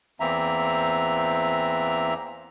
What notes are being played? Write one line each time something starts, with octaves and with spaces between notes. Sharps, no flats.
E2 E3 A#3 C4 E5 A#5